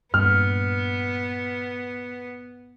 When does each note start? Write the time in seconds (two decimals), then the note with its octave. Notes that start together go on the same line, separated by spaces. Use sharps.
0.14 G2 A#2 B3 F6